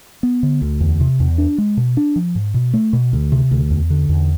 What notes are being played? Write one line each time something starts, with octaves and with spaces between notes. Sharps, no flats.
B3
D3
D2
E2
C3
E2
D4
G#3
B2
D4
F3
G#2
B2
A3
B2
D2
C3
D2
E2
D3
E2